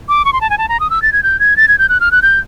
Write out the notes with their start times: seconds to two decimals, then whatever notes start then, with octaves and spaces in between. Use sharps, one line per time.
0.09 D6
0.25 C#6
0.33 C6
0.41 A5
0.50 G#5
0.58 A5
0.69 A#5
0.80 D#6
0.90 E6
1.02 A6
1.13 G#6
1.23 G6
1.40 G#6
1.57 A6
1.68 G#6
1.78 G6
1.89 F#6
2.00 F6
2.11 F#6
2.22 G6